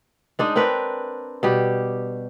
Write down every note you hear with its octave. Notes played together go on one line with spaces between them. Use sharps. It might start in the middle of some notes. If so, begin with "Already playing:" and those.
G#3 D4 D#4
C4 D4 A#4 B4
B2 G3 G4